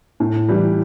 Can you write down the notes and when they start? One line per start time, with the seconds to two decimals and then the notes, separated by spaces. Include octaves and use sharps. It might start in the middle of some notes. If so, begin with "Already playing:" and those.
0.20 A2
0.49 E3 G3